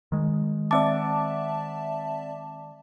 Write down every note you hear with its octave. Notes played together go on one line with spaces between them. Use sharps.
D#3 G#3
C4 D5 E5 A5 D6